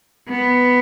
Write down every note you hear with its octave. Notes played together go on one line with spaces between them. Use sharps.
B3